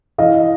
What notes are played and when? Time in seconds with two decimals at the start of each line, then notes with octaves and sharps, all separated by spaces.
0.18 E3 D#5 F5